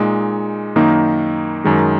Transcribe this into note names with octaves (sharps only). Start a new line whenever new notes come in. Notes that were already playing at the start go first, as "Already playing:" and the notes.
Already playing: A#2 G#3 D#4
F#2 D#3 A#3 D#4
F#2 D#3 G#3